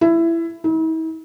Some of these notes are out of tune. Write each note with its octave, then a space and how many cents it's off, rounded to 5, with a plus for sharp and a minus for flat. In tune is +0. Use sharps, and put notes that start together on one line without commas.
E4 +15
E4 -45